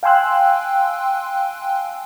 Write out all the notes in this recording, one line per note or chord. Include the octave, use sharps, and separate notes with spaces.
F5 G5 G#5 C6 E6 F#6